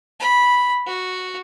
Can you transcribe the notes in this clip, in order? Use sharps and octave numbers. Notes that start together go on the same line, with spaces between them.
B5
F#4